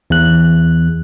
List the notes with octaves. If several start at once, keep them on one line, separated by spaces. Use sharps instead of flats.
E2 F#6